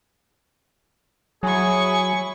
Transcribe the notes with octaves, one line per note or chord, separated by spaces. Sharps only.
F#3 E4 G#4 G#5 C#6